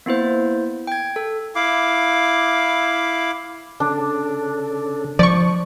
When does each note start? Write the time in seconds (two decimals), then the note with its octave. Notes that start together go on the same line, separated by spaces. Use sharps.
0.06 A#3 B3 E4 C5
0.87 G5 G#6
1.16 A4
1.55 E4 F5 D6
3.80 C#3 D4 A4
5.19 F3 D5 C#6